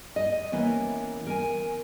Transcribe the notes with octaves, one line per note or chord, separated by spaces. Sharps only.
D#5
E3 A#3 B3 C#4
A#4 G#5